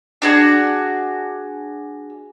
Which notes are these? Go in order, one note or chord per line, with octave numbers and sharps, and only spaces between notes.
D4 F#4 G#4